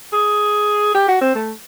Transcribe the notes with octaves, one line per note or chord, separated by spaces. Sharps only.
G#4
G4
F#4
C4
A3